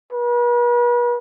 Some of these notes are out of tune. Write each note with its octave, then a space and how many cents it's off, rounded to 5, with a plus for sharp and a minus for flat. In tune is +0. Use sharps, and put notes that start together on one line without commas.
B4 -40